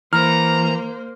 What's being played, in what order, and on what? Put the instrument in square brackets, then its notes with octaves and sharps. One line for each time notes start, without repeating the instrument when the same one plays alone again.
[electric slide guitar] E3 [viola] A#3 C5 [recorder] A#5 [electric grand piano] F6